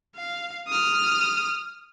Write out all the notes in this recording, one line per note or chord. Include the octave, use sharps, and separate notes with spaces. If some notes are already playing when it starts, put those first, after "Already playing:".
F5
D#6 F6